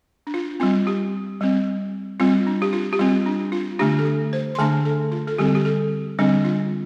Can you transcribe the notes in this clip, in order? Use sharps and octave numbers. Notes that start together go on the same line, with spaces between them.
D4
F4
G3 C4 F4
G4
G3 C4
G3 C4 F4
D4
G4
F4
G4
G3 C4 F4
D4
F4
D3 A3 D4 G4
A4
G4
C5
C6
D3 A3 D4 A5
A4
F4
A4
D3 G3 C4 G4
G4
A4
D3 G3 C4 D4
F4